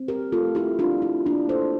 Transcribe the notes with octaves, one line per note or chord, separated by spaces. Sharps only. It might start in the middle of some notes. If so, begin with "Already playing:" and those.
Already playing: C4
G4 A#4
A3 F4 A4
E4 G4
C4 D4 F4
E4
A#3 D4
A4 C5